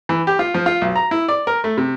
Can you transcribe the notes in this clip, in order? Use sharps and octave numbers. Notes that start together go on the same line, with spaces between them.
E3
G4
F4
F3
F4
B1
A#5
E4
D5
A#4
A3
C3